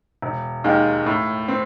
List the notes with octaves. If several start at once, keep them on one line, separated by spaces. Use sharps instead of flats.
E1
D#2 D#3 G#3
A2
C4